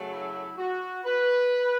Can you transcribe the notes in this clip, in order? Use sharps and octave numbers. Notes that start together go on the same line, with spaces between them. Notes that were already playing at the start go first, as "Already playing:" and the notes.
Already playing: F#2 C#3 F#3 A3
E4
F#4
B4